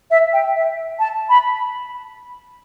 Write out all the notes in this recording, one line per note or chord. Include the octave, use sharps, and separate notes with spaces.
E5
G5
E5
A5
B5